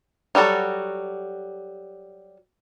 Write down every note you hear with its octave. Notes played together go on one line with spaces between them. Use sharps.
F#3 G3 F#4 A4